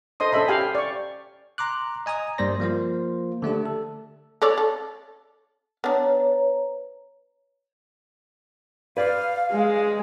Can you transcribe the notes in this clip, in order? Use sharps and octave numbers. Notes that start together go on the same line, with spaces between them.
A4 C5 D#5 C6 D#6
C#4 A4 C5 D#5 E5 B5
G4 F5 G5 G#5
G5
D5 C#6
A#5 C6 D6 F#6
D#5 G#5 A#5 D#6
G2 G3 A#3 C5 D5 A#6
F3 A#3 F4 C5
D3 A3 D4 G4
A4
A4 C#5 D5
A4
B3 D4 B4 C#5 A#5
B4 D5 F5
G#3